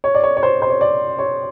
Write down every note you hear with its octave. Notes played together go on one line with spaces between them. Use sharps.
C#5
D5
C#5
C#5
C5
C5
C#5
D5
C#5